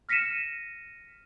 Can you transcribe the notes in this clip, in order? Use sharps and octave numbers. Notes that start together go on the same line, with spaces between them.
F6 A#6 B6 C#7 D#7 E7